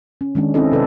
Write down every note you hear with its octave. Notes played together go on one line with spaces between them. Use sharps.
C#4
D#3 G#3 C#4 D4
C4 C#4 E4 A4 D#5
C3 A4 B4 D5